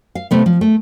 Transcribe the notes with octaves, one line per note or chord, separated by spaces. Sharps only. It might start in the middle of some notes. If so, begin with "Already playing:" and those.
F5
C3 A3 B3
F3
A3